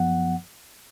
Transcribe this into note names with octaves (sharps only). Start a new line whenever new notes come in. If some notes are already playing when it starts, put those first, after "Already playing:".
Already playing: F#2 F3 B3 F#5